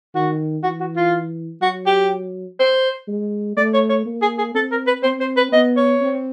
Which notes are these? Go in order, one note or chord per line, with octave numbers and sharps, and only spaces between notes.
D#3 F#4
E3 F#4
F#4
F4
F#3 F#4
G4
C5
G#3
A3 D5
C#5
C#5
A#3
G#4
G#4
C4 A4
A#4
B4
C4 C5
C5
B4
B3 D#5
C#5
C4